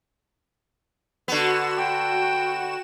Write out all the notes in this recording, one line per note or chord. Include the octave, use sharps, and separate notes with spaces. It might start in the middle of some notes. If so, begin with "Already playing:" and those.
D3 B3 F#4 E7
G5